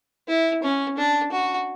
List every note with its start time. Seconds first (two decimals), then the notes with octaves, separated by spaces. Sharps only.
0.28 E4
0.63 C#4
0.97 D4
1.32 F#4